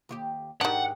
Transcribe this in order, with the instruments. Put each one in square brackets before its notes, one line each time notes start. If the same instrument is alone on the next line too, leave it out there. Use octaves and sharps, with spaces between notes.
[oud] D#2 F4 G4
[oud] G#2 G4 [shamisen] D#3 D4 [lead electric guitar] F#5